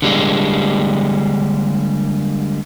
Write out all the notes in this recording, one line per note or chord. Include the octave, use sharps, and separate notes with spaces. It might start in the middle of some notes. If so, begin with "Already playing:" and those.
D3 G3 G#3 A#3